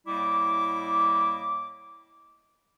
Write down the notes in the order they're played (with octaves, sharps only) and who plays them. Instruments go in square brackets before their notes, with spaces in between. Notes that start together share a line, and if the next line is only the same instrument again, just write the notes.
[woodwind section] A2 G3 A#3 E4 D#5 D6